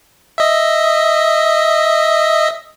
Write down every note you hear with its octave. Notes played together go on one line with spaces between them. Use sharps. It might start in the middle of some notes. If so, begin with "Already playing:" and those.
D#5 E5